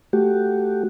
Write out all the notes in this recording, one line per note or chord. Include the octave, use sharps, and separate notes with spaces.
A3 F#4 G4